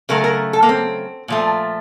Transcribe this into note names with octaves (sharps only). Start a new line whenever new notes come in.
C#3 F#3 A3 A#4
A#4
A4
A#3
C4
A#2 F3 A3